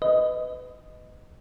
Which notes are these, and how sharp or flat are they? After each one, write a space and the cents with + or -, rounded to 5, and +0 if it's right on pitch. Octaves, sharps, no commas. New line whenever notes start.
B4 +30 D#5 +0